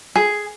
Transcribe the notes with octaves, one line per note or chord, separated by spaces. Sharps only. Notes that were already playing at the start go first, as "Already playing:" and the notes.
G#4